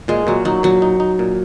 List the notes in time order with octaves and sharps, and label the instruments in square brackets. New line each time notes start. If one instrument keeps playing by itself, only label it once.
[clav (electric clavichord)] A#2 [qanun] G#3
[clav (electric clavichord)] A#2 [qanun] F#3
[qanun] F#3 [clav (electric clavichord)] D#4
[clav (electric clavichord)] A#2 [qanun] F#3
[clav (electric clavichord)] D#4
D#4
A#2